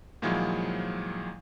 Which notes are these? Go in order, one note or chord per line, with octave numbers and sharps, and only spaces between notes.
A#2 D#3 F3 F#3 G#3 E4